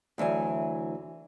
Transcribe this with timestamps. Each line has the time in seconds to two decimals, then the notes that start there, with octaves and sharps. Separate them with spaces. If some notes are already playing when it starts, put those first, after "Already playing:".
0.18 D2 E3 F#3 G#5